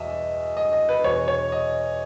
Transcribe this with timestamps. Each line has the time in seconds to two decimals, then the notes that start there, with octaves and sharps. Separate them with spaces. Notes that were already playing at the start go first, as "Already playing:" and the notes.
Already playing: E2 B2 D#5 E5
0.57 D#5
0.73 D#5
0.89 B4
1.04 E2 B2 C#5
1.28 C#5
1.52 D#5